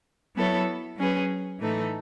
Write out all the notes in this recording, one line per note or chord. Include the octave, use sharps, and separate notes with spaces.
F#3 B3 E4 A4 C#5
F#3 C#4 G#4 B4
A2 E3 A3 D#4 A4